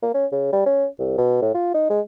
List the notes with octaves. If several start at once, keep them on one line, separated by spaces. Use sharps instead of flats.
A#3
C#4
C#3
G3
C#4
C2
B2
A2
F4
D#4
G#3